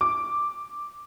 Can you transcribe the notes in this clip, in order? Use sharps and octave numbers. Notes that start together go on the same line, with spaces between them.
D6